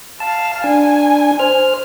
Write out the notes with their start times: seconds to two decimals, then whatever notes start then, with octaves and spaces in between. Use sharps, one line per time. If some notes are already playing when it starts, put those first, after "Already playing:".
0.20 F5 A5
0.64 D4 G#5
1.39 C5 F6